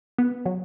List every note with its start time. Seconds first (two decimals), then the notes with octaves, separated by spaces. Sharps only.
0.18 B3
0.46 F#3